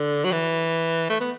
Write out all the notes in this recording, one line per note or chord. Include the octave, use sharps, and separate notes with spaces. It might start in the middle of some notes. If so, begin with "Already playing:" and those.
Already playing: D3
F#3
E3
A3
B3